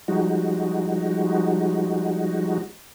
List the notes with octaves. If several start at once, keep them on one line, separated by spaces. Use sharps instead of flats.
F3 G3 G#3 D#4 F#4